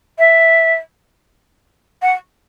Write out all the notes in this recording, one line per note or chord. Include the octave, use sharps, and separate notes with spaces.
E5
F#5